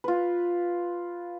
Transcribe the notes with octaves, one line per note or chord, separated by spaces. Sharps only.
F4 B4